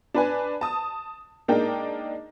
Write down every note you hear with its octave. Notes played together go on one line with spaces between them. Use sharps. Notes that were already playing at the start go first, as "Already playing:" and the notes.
D4 B4 G#5
A5 D#6
G#3 A#3 D4 D#4 A#4 G5